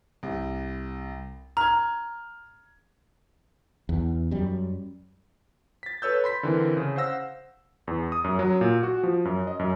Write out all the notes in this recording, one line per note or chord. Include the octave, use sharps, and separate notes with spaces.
C2
A#5 F6 G#6
E2
F#2 G3
A6 B6
A4 B4 C#5 E6 G6
B5 C6 B6
D3 E3 C4 A#4
C#3
C5 F5 F#5 E6 A#6
E2
D#6
F#2
F#3
A#2
F#4
F3
F#2
D#5
F#2